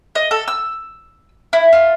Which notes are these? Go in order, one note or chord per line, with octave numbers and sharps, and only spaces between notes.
D#5
A4
E6
E4
F4